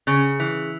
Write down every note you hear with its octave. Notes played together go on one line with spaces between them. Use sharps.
C#3
E3